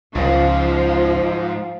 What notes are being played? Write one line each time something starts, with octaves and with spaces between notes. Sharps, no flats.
C#2 G#2 F3